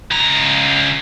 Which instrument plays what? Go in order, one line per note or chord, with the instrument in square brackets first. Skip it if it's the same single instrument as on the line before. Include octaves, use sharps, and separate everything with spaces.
[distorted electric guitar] C#2 A#5